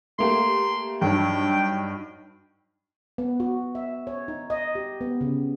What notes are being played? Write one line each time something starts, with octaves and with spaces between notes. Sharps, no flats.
A3 A#3 G4 C6
G2 F#3 D4 D#4 G5
B3
F#4
E5
C#5
D#4
D#5
G4
B3
C#3